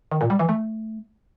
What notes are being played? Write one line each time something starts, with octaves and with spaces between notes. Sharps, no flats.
D#3
A#2
G3
E3
A3